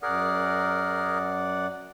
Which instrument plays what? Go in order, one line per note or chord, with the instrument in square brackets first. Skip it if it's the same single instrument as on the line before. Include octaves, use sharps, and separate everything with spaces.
[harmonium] F#2 D5 F#5 [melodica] G#4 A#4